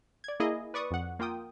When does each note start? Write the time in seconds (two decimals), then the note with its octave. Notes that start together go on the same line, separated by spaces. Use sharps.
0.24 D5 G#6
0.40 A#3 E4 G#4 D#5
0.74 B4 D5 C#6 D#6
0.91 F2 F#5
1.19 A#3 F4 G5 D#6